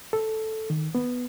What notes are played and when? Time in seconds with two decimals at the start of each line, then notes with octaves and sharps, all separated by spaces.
0.13 A4
0.70 D#3
0.95 B3